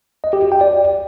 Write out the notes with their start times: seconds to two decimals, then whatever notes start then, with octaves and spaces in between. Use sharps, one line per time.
0.24 D#5
0.33 G4
0.42 F#4
0.52 G5
0.61 D5